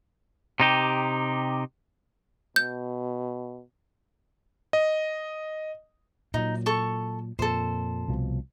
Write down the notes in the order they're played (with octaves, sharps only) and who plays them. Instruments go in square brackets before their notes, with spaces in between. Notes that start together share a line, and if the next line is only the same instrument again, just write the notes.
[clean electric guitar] C3 D#4 G4
[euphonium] B2 [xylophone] G6
[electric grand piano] D#5
[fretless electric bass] A#2 F#3 [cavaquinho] D#4
[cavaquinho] A4 C#6
[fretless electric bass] F2 A#2 [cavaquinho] A4 C5
[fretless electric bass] C2 B2 F3